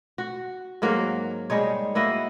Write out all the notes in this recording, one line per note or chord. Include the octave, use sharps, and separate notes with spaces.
F#4
G#2 F#3 A#3 F#4
G3 G#3 D#4 C#5
A#3 E4 F#4 D#5